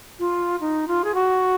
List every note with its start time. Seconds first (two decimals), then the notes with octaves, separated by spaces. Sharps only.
0.19 F4
0.60 D#4
0.88 F4
1.04 G#4
1.15 F#4